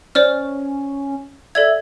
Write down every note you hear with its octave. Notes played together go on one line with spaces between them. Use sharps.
C#4 C5 D5 F6
A4 D5 E5 G#6